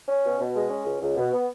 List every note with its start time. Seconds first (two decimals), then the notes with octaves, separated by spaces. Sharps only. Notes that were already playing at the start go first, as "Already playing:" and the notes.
0.08 C#4
0.24 B2
0.39 B2
0.55 G#3
0.70 C#4
0.85 C#2
1.01 C#2
1.16 B2
1.31 B3